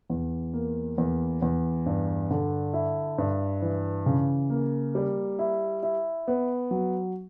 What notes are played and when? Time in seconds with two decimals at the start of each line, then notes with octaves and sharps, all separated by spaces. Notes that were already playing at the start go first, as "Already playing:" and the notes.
0.10 E2
0.54 A#3
0.98 E2
1.42 E2
1.86 G2
2.31 D3
2.73 E4
3.18 G2
3.62 E3
4.06 C#3
4.50 A#3
4.95 G3
5.39 E4
5.83 E4
6.28 B3
6.71 F#3